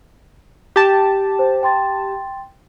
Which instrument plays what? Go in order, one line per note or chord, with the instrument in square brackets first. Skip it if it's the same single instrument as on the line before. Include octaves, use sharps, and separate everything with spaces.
[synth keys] G4 A5
[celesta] C5
G5 C6 A6